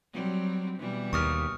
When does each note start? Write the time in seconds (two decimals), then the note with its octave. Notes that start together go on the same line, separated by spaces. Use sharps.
0.13 F#3 G3 C4
0.78 B2 E3 G3
1.13 D#2 C#6 D#6 F6